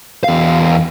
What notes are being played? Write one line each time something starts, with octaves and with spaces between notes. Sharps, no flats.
E2 F5